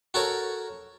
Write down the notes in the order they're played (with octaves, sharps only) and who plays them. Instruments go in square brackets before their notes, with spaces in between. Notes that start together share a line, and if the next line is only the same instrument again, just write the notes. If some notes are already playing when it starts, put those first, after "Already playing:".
[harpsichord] F#4 A4 A#4 C#5